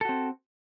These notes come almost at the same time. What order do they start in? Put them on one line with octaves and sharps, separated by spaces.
A4 F#4 C4